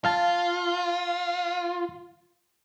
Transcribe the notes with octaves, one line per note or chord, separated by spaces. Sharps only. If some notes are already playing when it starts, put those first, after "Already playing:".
F4 F5 A5